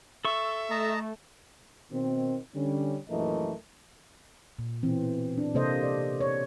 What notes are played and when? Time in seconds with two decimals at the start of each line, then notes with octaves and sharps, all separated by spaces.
0.25 A4 E5 C#6
0.70 A3 D#5 A5 A#5
1.91 B2 D#3 C4
2.55 D3 G3 C#4
3.09 A#1 F#2 E3 A3 A#4 D#5
4.59 A#2
4.83 B2 E3 C4
5.38 D4
5.55 C3 A#3 A4 C5 D#5
5.83 D5
6.20 C#5